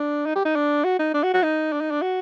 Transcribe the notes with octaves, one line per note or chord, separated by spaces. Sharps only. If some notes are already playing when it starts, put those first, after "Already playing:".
Already playing: D4
D#4
G4
D#4
D4
F#4
D#4
D4
F#4
F#4
D#4
D4
D#4
D4
F#4